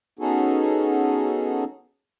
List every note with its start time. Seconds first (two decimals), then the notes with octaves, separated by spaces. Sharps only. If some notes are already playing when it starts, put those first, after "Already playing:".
0.19 B3 C#4 D#4 F#4 G#4 A4